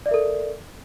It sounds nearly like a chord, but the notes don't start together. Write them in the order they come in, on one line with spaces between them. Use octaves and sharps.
D5 E5 A#4 A4